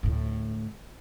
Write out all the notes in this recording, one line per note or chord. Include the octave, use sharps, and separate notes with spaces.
D2 A2